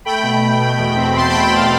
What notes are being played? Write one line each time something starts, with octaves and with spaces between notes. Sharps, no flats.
A3 G5 B5
B2
B2
B2
E2
C4
E2 A5 C6
G5 B5
B2
G5 B5
E2 F5 A5